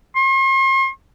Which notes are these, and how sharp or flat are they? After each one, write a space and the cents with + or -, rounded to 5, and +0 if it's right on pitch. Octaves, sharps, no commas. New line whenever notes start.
C6 +45